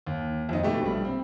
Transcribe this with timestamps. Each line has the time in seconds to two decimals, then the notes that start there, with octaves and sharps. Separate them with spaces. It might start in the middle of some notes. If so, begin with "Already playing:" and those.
0.07 D#2
0.49 F2 D#4
0.63 B2 A3 G4
0.81 A#1 G3
1.05 C4